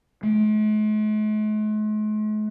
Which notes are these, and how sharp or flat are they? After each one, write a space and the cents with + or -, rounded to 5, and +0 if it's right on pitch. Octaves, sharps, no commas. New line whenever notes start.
G#3 +45